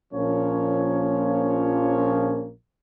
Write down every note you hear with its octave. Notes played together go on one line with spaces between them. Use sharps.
A#1 A#2 F3 A#3 C#4 C#5